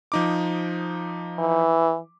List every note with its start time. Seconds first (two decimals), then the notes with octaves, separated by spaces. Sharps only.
0.12 F3 D#4 D6
1.39 E3